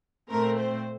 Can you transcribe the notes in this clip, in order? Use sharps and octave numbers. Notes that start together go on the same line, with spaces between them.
A#2 A3 C4 A#4
C5